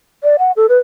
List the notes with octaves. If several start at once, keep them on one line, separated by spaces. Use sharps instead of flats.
D5
F#5
A4
B4